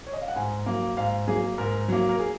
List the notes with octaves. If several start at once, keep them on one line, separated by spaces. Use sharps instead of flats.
C#5
D#5
F5
F#5
G#2 G#5
F#3 A#3
G#2 F5
F#3 A#3 G#4
G#2 A#4
F#3 A#3
A#4
G#4